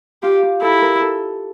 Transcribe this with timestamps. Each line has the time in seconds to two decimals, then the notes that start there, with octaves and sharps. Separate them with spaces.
0.23 F4 G4
0.43 G4
0.62 E4 A4
0.82 A#4
1.01 A4